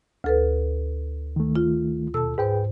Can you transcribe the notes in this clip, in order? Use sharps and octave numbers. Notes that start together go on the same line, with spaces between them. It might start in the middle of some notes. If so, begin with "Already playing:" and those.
D2 A4 B4
D#3 A3
F4
D#2 B2 A4 A5 E6
G#2 G#4 B4 C5 G5